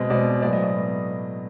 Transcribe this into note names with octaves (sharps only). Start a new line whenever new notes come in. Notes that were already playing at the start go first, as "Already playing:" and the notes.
Already playing: B2 G#3 C4 D#5
B2 G#3 C4 D5
A2 F#3 B3 D5
D#5
D#5